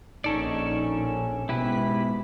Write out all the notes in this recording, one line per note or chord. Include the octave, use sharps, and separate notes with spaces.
A#1 C#4 D#4 A4 D5 C#6
G#2 B2 G#3 E4 G4 B4 B6